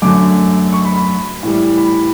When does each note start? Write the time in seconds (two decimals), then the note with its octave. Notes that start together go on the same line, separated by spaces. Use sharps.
0.02 F#2 D3 F#3 A3 D6
0.73 C#6
0.85 B5
0.96 B5
1.43 A2 E3 G3
1.78 B5